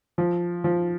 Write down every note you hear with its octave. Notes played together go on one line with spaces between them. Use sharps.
F3
F3